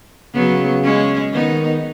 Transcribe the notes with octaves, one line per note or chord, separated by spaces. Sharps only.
C#3 F#3 B3
G#3 C#4
D#3 B3 D#4